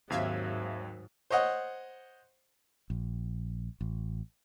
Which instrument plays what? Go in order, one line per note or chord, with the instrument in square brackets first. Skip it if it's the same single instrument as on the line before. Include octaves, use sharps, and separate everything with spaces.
[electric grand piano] D#2 C4 [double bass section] G#2 [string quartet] D#3 F#3 [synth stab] E5 F5 G#6
[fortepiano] C5 C#5 D#5 F#5
[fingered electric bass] A#1
A1